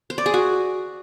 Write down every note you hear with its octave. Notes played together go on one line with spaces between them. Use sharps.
C5
D5
G#4
F#4